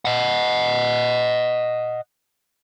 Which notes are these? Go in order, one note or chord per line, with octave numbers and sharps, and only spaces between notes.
D#5 F#5